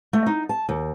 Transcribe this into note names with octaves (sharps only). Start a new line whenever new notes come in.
A3
D#4
A5
D#2